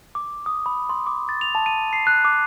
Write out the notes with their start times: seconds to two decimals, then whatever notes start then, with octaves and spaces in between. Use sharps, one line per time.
0.15 D6
0.46 D#6
0.66 B5
0.89 C6
1.07 D6
1.29 A6
1.41 F7
1.55 A5
1.66 D#7
1.93 C7
2.07 F#6
2.25 D6